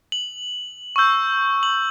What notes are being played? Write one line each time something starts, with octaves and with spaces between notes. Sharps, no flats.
F#7
C#6 E6 G6
F#7